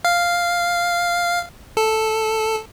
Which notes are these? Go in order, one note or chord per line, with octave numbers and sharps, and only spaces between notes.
F5
A4